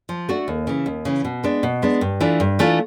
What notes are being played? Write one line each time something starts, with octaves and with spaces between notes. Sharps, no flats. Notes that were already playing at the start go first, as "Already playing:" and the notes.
F3
A3 D4 F#4
D#2
C#3 E3
D#2
C#3 E3
B2
G#3 B3 D4
B2
G#3 B3 D4
G2
E3 A3 D4 F4
G2
E3 A3 D4 F4